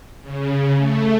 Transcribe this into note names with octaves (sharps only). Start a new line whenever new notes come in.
C#3
A3